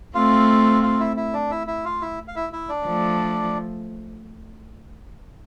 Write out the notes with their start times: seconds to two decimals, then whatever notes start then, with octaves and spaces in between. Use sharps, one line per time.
0.15 A3 C4 F4 F5
0.83 F4 F5
0.99 E4 E5
1.16 E4 E5
1.33 D4 D5
1.51 E4 E5
1.67 E4 E5
1.85 F4 F5
2.01 E4 E5
2.28 F5
2.36 E4 E5
2.53 E4 E5
2.69 D4 D5
2.86 F3 A3